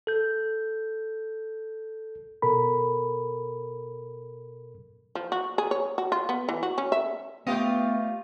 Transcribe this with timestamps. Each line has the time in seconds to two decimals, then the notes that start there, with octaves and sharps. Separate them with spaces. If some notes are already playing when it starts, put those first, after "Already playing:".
0.07 A4 G6
2.42 B2 A4 A#4 B5
5.15 F3
5.32 F#4
5.58 G#4
5.71 C#5
5.98 F#4
6.12 F4
6.29 B3
6.49 E3
6.63 F#4
6.78 C#4
6.92 E5
7.47 A3 B3 F4 G4 B4 D#5 G5